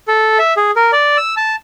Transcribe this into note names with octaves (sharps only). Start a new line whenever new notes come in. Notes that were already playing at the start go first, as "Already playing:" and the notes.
A4
E5
G#4
A#4
D5
E6
A5